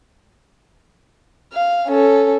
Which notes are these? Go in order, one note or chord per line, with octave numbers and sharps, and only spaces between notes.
F5
C#4 A4